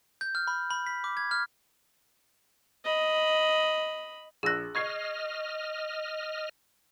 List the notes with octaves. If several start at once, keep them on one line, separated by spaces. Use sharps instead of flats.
G6
F6
B5
B5
B6
D6
G#6
F6
D#5 B5
A#1 G#4 E6 F#6 A#6
D#5 C#6 F6 G#6 C7